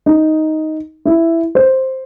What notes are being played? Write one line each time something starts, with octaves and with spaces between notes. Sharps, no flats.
D#4
E4
C5